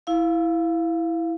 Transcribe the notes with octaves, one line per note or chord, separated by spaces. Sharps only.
E4 F5